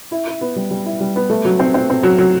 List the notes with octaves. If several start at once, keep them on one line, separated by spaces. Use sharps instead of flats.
E4
E4
B3
G3
G3
E4
G3
B3
A3
F#3
C4
C4
C4
F#3
F#3